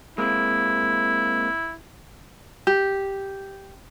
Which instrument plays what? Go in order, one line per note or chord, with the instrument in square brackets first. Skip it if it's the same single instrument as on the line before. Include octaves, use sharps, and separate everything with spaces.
[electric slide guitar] G#3 A#3 C4 [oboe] E4
[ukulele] G4